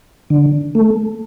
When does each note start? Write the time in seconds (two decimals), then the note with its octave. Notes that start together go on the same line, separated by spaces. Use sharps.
0.30 D3
0.75 A3